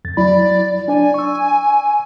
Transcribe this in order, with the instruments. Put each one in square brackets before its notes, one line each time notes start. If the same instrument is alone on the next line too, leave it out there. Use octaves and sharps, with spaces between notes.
[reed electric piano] F2 A6
[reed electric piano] F#3 E4 B5 [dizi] D5
[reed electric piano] D4 D5 [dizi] G#5
[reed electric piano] C#6 E6